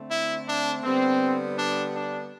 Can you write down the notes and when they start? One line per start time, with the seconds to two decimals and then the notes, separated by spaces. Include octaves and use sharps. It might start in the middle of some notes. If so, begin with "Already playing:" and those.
Already playing: D3 A3 C4
0.10 E4
0.47 D4
0.84 D3 G3 B3 C4
1.58 D4
1.95 D4